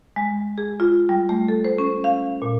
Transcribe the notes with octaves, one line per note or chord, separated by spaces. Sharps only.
G#3
G#4
F4
G3
A3
A4
C5
C#4
F5
A#2